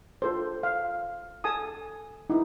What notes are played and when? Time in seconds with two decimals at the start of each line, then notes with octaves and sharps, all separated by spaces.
0.22 F4 A4 C5
0.63 F5
1.44 A4 G#5 A5 D#6
2.30 D#4 E4